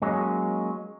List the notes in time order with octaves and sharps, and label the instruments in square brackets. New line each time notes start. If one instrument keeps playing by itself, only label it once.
[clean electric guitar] F#3 G#3 A#3 C#4 D#4